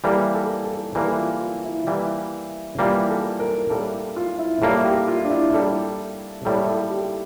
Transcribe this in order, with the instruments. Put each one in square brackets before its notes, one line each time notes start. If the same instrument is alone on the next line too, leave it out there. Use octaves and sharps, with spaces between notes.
[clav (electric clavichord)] E3 G3 A#3 [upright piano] A4
[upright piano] A4
A4
[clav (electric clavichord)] E3 G3 A#3 [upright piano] A4
[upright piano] F4
F4
E4
[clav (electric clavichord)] E3 G3 A#3
[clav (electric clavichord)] E3 G3 A#3 [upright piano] F4
[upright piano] A4
A#4
[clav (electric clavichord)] A2 G3 A#3 [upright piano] A4
[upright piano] F4
E4
[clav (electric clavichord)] A2 G3 A#3 [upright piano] A4
[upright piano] G4
F4
D4
E4
[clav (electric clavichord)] A2 G3 A#3 [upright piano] A4
[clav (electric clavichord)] A2 G3 A#3 [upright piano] A4
[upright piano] A4
G4